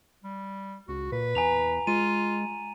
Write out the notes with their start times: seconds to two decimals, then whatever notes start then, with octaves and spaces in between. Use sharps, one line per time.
0.24 G3
0.88 C#2 F#4
1.12 A#2 B4
1.35 E2 G#5 A#5 F7
1.87 G#3 F4 D#7